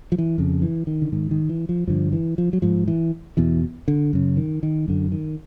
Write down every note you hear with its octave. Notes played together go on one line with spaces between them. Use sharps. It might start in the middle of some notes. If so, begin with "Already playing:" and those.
F3
E3
F2 C#3
E3
D#3
D3
G#2 D#3
D#3
E3
F3
G2 D3 F3
E3
F3
F#3
G#2 F3
E3
E2 B2 E3
D3
F#2 C#3
D#3
D#3
F#2 D3
D#3